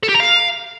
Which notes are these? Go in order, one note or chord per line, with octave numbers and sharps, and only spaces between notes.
A4
G4
A#5
F5